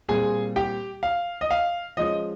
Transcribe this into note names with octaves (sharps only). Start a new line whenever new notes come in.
A#2 G3 C4 G#4 G#5
G4 G5
F5
D#5
F5
F3 G#3 C#4 D#5